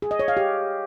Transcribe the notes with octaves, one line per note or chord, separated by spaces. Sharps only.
G#4
D#5
C#5
F5
G4